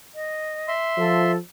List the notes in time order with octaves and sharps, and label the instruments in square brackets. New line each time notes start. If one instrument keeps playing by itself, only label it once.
[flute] D#5
[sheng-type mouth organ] E5 C6
[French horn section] F3 [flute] A4